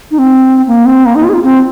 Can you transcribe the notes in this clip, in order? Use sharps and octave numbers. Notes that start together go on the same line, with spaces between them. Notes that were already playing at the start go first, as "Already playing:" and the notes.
D#4
C4
A#3
C4
A#3
D#4
F4
G#4
F4
C4